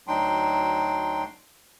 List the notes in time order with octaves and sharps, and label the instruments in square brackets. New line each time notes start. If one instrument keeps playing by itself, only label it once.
[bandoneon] D2 F#3 D4 D#4 G5 C6